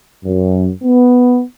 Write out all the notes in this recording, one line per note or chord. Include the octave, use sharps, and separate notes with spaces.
F#2
B3